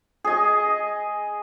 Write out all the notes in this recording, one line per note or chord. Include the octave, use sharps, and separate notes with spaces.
G#4 D#5